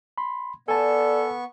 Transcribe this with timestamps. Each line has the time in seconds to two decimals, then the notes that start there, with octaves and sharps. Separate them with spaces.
0.18 B5 C6
0.68 B3 A4 D5 G#5 A5 C#6